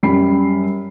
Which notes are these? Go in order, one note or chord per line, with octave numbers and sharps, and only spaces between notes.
F#2 G3 G4 B5 C7